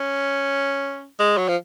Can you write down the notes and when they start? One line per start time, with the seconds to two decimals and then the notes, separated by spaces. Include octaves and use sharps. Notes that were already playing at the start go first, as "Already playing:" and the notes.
Already playing: C#4
1.19 G#3
1.37 F#3
1.48 F3